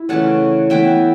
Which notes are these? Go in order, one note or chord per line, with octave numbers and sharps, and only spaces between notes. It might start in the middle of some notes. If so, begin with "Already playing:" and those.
Already playing: E4
C#3 E3 A3 C#4 F#5 A5
E3 B3 E4 E5 G5